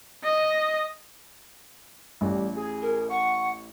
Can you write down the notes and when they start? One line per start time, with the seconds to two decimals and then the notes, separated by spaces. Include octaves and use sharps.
0.24 D#5
2.21 A1 G3
2.56 G#4
2.82 A#4
3.10 F#5 C#6